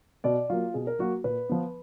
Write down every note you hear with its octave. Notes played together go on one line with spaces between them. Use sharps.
B2 D5
F#3 A#3 F4
B2 G#4
A#4
F#3 A#3 F#4
A#2 B4
F3 B3